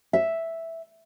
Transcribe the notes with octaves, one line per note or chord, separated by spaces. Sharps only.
E5